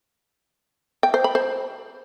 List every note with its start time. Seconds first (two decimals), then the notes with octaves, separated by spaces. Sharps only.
1.03 G5
1.14 C5
1.24 B5
1.35 C5